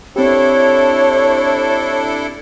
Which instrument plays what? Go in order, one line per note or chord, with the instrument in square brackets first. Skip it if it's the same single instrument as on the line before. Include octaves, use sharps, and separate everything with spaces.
[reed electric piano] C4 G4 [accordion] D4 E4 A4 [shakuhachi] C#5